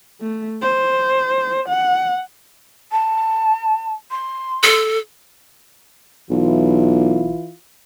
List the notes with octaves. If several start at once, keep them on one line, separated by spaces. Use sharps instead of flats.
A3
C5
F#5
A5
C6
A4
B1 E3 E4 F4